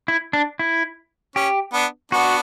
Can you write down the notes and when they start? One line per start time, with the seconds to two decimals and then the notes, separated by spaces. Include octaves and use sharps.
0.08 E4
0.33 D4
0.59 E4
1.36 C#4 G4
1.73 B3 D4
2.12 B3 D4 F#4